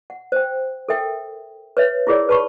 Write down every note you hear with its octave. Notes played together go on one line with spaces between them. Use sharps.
F#5
C5 G5
A4 A#4 E5 G5
B4 C#5 E5
E4 F4 G#4 A#4 C#5 D5
B4 A5 B5 C#6